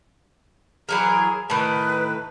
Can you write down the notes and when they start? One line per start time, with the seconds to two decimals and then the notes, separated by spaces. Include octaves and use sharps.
0.89 E3 F#3 G#4 A#4
1.50 A2 D#3 B4